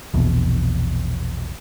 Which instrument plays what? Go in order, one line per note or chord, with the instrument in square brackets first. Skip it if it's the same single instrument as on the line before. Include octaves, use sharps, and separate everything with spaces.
[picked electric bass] A#1 E2 B2